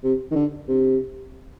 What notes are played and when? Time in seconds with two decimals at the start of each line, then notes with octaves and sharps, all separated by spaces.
0.03 C3
0.31 D#3
0.35 D3
0.68 C3